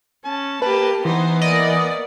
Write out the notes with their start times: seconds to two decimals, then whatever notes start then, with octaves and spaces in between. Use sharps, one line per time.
0.25 C#4 A5
0.62 A#3 G4 B4 A5 B5
1.05 E3 B3 D#4 C5
1.41 A#3 D5 D#5